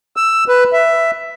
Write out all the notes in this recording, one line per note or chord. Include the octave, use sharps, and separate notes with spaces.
E6
B4
E5